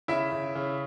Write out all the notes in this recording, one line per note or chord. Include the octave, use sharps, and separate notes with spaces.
C#3 E4 E5
C#3
C#3